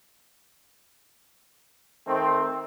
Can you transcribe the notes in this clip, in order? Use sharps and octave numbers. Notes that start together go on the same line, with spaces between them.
D#3 A3 C4